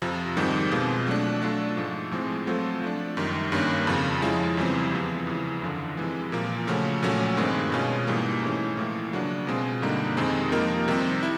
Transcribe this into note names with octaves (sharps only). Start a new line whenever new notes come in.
F2 C3 F3
G#2 D#3 G3 C4
B2 G#3 C4 F4
F#3 A3 D4
F#3 A3 D4 F4 A4
G#2 F3 A3
A2 F3 G#3 C4 F4
F#3 A3 C4 F4 A4
F3 A3 D4
F#2 D#3 G3
G2 D#3 G3 A#3 C#4
F2 C#3 F3
F3 G#3 C#4 E4
E2 C#3 E3 G3 C4
C3 F3 G#3 B3
E2 C#3 E3
F#2 D3 F3
C3 E3 G#3
A#2 F3 A#3
C#3 F3 A3 C#4 F#4
A#2 F#3 A3 C#4 F#4
G2 D#3 G#3 C4
B2 G#3 C#4 F4
G#2 E3 G3 A#3
G#2 E3 A3 C#4
A2 F3 A#3
C#3 F#3 A#3 D4 F#4
B2 G#3 C4 F4
G2 D3 G3 A#3 D#4
F2 C3 D#3 G#3 C4
F3 A#3 D#4 G4 A#4
C3 D#3 G3 C4
E4